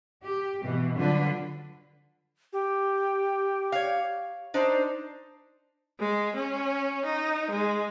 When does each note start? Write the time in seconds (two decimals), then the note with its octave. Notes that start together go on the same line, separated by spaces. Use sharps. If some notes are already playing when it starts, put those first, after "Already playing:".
0.24 G4
0.64 B2 E3
0.97 D3 F#3 G3 D4 F4 B4
2.53 G4
3.72 C#5 F5
4.54 D4 D#4 C5
5.99 G#3
6.35 C#4
7.04 D#4
7.50 G#3